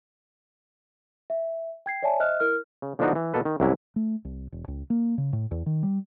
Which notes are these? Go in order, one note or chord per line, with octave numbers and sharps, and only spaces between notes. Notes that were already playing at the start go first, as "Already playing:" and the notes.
E5
G5 G#6 C7
C#5 D5 E5 G#5 A5
C5 D#5 E5 F6 F#6
E4 A#4 F6
C#3
D3 F3 B3 D4 D#4 F#4
E3
B2 A#3 A4 B4
D#3
C2 F#2 C3 F#3 E4
A3
C2
E1
C#2
A#3
C#3
A2
E2
D#3
G3